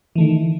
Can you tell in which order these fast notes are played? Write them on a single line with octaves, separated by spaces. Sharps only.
E3 A3 D#3